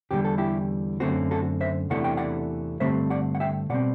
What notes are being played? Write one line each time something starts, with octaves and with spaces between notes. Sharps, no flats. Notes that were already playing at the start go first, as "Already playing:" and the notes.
E2 D3 G3 G4
A4
E4 G4
F#2 D3 A3 C4 F#4
F#4 A4
C5 E5
E2 C3 E3 A3 D4 F#5
G5
D5 F#5
G2 D3 A3 C4 C5 E5
D5 F#5
F#5
E5 G5
B2 G3 C4 D5 F#5